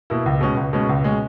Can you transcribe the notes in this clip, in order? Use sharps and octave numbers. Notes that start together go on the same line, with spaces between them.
B2 A#3 E4
C#2
B2 G#3 C#4
C#2
B2 G#3 C#4
C#2
B2 G#3 C#4